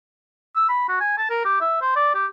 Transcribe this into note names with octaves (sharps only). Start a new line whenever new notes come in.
E6
B5
F#4
G#5
A5
A#4
G4
E5
C5
D5
G4